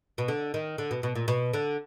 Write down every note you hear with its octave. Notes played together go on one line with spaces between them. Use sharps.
B2
D3
D#3
D3
B2
B2
A#2
B2
D3